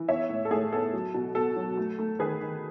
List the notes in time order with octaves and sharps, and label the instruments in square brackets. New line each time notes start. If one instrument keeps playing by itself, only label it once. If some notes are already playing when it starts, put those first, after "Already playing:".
Already playing: [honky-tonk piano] E3
B3 C#5 E5
A2
A4
A2 G#4
B3 A4
F#3
B2
B2 A4
F#3
A3
A3
D#3 G#4 B4
D#3